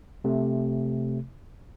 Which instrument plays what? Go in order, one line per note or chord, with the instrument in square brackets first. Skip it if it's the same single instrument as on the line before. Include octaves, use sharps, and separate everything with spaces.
[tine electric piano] C3 A3